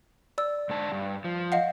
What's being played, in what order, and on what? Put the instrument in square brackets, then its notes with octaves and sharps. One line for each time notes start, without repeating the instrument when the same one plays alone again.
[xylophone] D5 E6
[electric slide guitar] G#2 D3 A5
G2
F3
[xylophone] D#5 F5 F#5